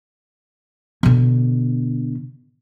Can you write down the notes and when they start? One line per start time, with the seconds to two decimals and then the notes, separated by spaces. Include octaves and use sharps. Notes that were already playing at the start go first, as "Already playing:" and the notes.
1.03 B2 D3